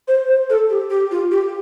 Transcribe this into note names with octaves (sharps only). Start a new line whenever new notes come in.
C5
C5
A4
G4
G4
F4
G4